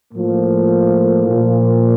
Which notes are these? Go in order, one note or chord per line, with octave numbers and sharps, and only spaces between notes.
A2 F3 A#3
A#2 F3